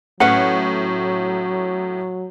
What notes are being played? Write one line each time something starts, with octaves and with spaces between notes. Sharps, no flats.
A2 F#3 C#4 B4 F#5